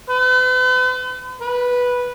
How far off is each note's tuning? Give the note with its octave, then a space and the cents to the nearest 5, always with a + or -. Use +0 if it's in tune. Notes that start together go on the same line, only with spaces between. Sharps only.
B4 +45
B4 -5